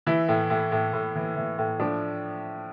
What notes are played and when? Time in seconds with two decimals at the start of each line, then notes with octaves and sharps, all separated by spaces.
0.06 E3 E4
0.28 A2
0.50 A2
0.72 A2
0.93 A2
1.15 E3
1.36 E3
1.58 A2
1.80 F3 D4